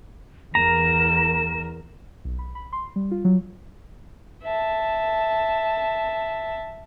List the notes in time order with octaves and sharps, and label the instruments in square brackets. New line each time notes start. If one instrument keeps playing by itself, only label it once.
[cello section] E2 A#4 [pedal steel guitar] A#5 [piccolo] E7
[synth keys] B1
B5
B5
C6
G3
F4
F#3
[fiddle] E5 A5